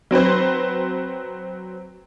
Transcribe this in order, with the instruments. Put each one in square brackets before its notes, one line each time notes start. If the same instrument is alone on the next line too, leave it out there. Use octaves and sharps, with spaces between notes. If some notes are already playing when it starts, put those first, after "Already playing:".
[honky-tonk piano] F#3 C4 B4 C5